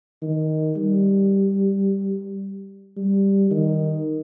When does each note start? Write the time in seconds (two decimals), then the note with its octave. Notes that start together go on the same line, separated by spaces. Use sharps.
0.22 D#3
0.77 G3
2.97 G3
3.51 D#3